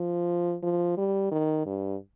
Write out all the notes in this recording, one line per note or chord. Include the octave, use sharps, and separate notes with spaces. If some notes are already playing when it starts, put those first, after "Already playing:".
Already playing: F3
F3
G3
D#3
G2